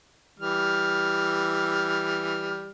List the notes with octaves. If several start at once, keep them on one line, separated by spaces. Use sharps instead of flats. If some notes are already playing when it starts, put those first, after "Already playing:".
E3 G3 F6